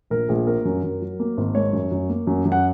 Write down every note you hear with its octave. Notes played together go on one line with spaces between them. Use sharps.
A#1 A#4
A#1 G#4
A#3 A#4
F#2
F#2
F#3
A#3
G#1
G#3 C#5
F#2
F#2
A#3
F#2
F#2
F#5